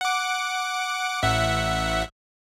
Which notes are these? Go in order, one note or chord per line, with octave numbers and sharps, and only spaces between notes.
F#5 D6
A1 E5 F#5